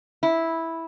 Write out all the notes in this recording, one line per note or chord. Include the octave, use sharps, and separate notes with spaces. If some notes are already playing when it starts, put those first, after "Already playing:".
E4